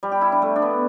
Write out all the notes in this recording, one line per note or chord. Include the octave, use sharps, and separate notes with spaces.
G3
G4
E4
D4
A3
D4
B3